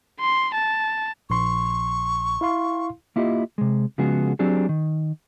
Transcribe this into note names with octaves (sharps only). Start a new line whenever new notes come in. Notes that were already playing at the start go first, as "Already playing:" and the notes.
C6
A5
A#1 C6 C#6
E4 F5 C6
A#3 E4 F4 G4 D#5
C3 G#3
C#3 F3 G#3 B3 F#4 G#4
F#3 C4 D4 G4 G#4
D#3